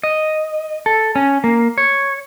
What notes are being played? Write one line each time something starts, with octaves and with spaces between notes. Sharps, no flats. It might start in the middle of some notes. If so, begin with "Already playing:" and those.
D#5
A4
C#4
A#3
C#5